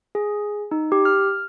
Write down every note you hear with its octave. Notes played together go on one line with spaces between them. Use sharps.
G#4
D#4
G4
F6